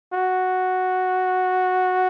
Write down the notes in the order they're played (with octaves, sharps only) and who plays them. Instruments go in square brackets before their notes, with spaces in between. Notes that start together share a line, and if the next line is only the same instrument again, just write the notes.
[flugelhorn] F#4